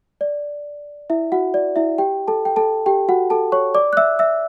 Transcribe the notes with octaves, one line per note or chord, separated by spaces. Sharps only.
D5
E4 E5
F#4 F#5
D5
E4 E5
G4 G5
A4 A5
G5
A4 A5
G4 G5
F#4 F#5
A4 A5
C#5 C#6
D5 D6
F#6
E5 E6
E5 E6